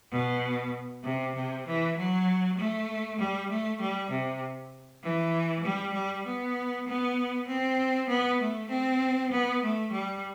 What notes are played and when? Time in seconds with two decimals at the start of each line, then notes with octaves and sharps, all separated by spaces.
0.11 B2
1.03 C3
1.34 C3
1.65 E3
1.95 F#3
2.57 A3
3.18 G3
3.48 A3
3.79 G3
4.09 C3
5.01 E3
5.62 G3
5.93 G3
6.24 B3
6.85 B3
7.46 C4
8.08 B3
8.39 A3
8.69 C4
9.30 B3
9.61 A3
9.91 G3